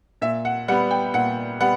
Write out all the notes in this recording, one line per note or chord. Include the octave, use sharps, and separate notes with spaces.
A#2 E5
F#5
G3 B3 F#5
G5
A#2 F#5
G3 B3 F#5